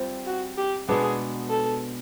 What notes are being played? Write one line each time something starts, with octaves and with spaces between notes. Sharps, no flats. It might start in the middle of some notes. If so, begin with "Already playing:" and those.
Already playing: G3 C4 F4
F#4
G4
B2 G#3 B3 D4 G#4
A4